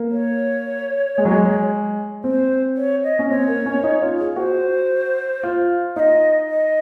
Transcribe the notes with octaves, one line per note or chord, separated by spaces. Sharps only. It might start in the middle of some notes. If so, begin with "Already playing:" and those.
Already playing: A#3
C#5
G#3
F#3
G#3
C4 C5
C#5
D#5
C#4
C4 C#5
A#3
C#4
D#4
F4
G#4
F#4 C5
F4
D#4 D#5 F5
D#5